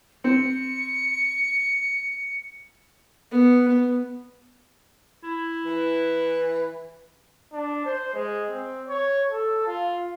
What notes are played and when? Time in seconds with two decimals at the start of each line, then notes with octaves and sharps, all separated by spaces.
0.24 C4 C#7
3.31 B3
3.68 B3
5.23 E4
5.66 E3 B4
7.53 D4
7.85 C5
8.14 G#3
8.50 C4
8.87 C#5
9.30 A4
9.67 F4